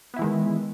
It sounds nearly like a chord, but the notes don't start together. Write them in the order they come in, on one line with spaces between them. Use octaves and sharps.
B3 E4 E3 G#3 D#3